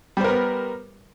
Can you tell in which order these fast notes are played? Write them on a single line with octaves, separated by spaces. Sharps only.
G3 C5 A#4 B3